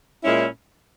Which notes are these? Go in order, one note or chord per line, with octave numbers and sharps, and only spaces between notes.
A#2 G#3 C#4 E4